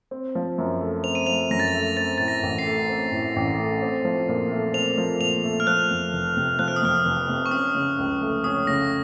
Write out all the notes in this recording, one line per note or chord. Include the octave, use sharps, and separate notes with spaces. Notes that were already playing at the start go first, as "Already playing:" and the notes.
C4
F3
F#2
A3
C4 F7
D#7
F3 F7
F#2 A#6
A6
A#6
A3
C4 A6
A2 A6
A#6
A1
C7
A3
C4
A2
A1
A3
C4
F3
A#2
A3
C4 F7
F3
A#2 F7
A3
F6
F3 F#6
F2
F1
C3
F3 F#6
F6
D#6
F2 F6
F1
C3
C#6
C#4 D#6
C#3
C#2
A3
C#4 D#6
C#3 A#6